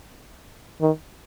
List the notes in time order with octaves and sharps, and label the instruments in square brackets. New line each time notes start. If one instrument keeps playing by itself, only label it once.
[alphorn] D#3